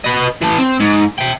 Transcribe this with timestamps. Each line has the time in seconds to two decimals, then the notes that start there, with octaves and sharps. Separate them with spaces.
0.05 B4 D#5
0.42 E3 A5
0.58 C4
0.80 G#2
1.18 E5 G5